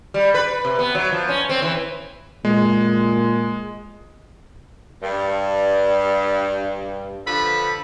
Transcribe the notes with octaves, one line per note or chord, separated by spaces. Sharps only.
G3
B4
C3
B3
F#3
F3
C#4
C4
E3
A#2 G#3
G2
D3 F3 A4 B4 B5